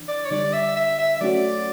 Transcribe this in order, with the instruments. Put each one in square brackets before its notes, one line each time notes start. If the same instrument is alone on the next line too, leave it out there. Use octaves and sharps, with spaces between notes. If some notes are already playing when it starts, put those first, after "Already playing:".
Already playing: [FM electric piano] E3 D4
[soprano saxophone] D5
C#5
[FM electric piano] D3 G3 D4 [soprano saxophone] D5
[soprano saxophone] E5
E5
E5
E5
[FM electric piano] F#3 A3 C#4 F#4 [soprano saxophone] D5